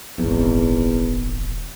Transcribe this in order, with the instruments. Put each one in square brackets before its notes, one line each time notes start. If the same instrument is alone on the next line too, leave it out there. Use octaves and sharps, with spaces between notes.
[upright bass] D#1 G#1 [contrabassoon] E2